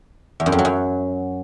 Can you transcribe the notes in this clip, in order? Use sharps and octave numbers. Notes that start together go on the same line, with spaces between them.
E2
F#2
F2
F#3
F#2